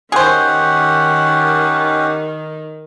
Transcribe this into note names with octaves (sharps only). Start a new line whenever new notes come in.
D#3 C#4 G4 G#4 C5 F#5